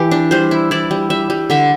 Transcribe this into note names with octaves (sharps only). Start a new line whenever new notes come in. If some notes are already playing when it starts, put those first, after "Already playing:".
Already playing: E3 G4
D4
G3 C5
E4
E4 D5
G3
G3 E5
G3
D3 E5